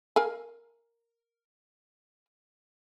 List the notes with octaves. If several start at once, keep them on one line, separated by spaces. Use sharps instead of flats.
A#4 F5 G#5